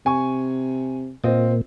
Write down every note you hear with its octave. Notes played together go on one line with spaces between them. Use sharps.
C3 G#5 C#6
A#2 C4 F4 D#5